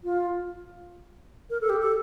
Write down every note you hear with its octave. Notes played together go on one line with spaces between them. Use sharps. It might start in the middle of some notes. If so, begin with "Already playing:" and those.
F4
A#4
A4
G4
A4